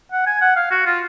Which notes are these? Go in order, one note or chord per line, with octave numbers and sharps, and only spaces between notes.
F#5
G#5
F#5
F5
F#4
F4